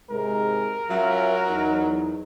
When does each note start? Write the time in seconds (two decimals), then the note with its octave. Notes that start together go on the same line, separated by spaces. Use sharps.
0.10 G#2 C3 G#3 A#4
0.90 F#3 C#4 F4 E5
1.49 E2 D#4